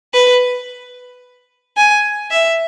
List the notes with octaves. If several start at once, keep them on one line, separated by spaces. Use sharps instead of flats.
B4
G#5
E5